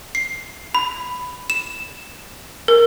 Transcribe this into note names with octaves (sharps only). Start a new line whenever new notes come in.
C7
B5
E7
A#4